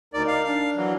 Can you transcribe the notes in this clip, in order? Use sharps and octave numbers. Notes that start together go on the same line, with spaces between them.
D2 D#4 A#4 D5
F5
D4 F5
E3 F#3